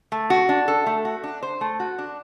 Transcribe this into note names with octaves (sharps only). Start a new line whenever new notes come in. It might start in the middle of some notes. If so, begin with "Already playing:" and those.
A3
F#4
D4
A4
A3
F#4
D4
C5
A3
F#4
D4